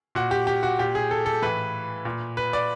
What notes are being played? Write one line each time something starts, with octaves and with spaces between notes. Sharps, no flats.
A#2 F#4
G4
G4
F#4
A#2 G4
G#4
A4
A4
A2 E3 B4
A#2
B4
D5